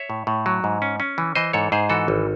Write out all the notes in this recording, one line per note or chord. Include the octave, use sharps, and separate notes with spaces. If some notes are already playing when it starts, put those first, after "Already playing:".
Already playing: C#5 E5
A2
A2
F#3
G#2
C#4
C#4
E3
E3 C5 D#5
G#2 A4 C#5
G#2 G#4 C5
E3 F#4 A4
G#1